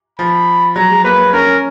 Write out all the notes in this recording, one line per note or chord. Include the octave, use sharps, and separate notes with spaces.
F3 B5
F#3 A#5
G#3
A#3 B4
C#4 A#4
C#4